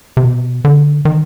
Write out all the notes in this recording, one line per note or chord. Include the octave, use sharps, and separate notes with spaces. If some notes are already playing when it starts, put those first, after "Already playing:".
C3
B2
D3
D#3